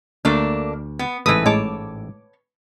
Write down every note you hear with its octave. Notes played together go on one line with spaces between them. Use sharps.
D2 A3 A#3 D4
B3
A1 G#2 E3 A4 B4 D#6
A2 G#3 C#5 A5 D6